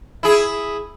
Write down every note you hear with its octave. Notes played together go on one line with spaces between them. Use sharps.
E4 G#4